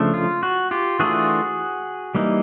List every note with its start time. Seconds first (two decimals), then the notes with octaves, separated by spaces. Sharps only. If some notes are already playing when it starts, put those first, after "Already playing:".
Already playing: C#3 F3 A3 D4
0.14 F4
0.43 F#4
0.71 F4 G4
1.00 E3 A3 D4 F4 F#4 G#4
2.15 E3 G3 A#3 D#4